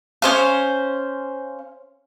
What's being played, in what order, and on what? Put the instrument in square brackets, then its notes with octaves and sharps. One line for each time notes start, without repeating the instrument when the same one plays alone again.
[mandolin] C#4 C5 F5